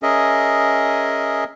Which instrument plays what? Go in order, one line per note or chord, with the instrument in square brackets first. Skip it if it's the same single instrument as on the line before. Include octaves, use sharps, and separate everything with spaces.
[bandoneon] C#4 G#4 A#4 D#5 E5